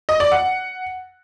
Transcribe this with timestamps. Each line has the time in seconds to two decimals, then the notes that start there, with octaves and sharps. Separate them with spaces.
0.09 D#5
0.20 D5
0.32 F#5